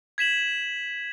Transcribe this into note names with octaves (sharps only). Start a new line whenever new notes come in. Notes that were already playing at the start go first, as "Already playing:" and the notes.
G#6 B6 E7 F#7